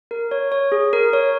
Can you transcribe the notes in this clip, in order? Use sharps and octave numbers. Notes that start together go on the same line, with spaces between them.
A#4
C#5
C#5
G#4
A#4
C#5